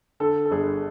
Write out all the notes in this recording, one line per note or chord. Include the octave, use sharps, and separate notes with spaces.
D3 A4
A4
G1 G#4